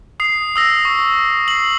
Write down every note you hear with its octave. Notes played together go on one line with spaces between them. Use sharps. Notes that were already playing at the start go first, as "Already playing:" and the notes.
D#6 C7
D#6 E6 A#6
C#6
C7 F#7